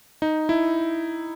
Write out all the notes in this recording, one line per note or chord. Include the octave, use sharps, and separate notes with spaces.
D#4
E4